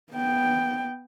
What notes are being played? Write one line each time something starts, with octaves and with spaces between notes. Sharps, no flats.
B3 G5